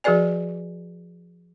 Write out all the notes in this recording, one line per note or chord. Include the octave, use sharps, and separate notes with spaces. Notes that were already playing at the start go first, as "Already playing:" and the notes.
F3 F#4 G#4 B4 D5 G#5